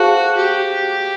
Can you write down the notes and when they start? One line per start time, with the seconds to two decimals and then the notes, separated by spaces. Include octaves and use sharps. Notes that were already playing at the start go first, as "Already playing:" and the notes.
Already playing: F#4 G#4 C5 F5 A5 C#6
0.38 G4